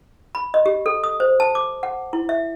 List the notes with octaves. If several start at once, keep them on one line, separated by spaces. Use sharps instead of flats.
B5
D#5
G4
A4
D#6
C5
A5
D6
F#5
E4
E5